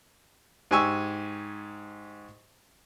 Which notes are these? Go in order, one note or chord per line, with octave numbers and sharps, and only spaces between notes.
G#2 G4 G#5 C#6 E6